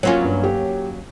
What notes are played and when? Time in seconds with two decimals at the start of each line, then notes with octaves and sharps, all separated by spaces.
0.03 F#3 A#3 C#4 F4 C#5
0.22 G2
0.44 G4